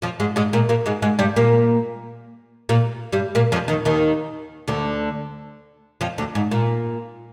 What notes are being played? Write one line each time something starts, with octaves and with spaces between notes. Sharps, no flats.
F2 F3
G#2 G#3
G#2 G#3
A#2 A#3
A#2 A#3
G#2 G#3
G#2 G#3
G2 G3
A#2 A#3
A#2 A#3
G2 G3
A#2 A#3
F2 F3
D#2 D#3
D#2 D#3
D2 D3
F2 F3
D2 D3
G#2
A#2